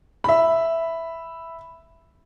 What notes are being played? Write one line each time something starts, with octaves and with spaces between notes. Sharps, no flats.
E5 B5